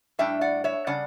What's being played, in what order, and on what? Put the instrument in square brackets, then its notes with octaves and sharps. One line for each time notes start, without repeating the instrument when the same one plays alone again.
[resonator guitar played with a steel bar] A2 G3 D4 E5 G5
D5 F#5
C#5 E5
C#3 G3 D4 D5 F#5